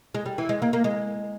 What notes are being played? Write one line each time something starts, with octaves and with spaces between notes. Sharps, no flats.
G#3
G3
E3
G#3
A#3
A#3
G#3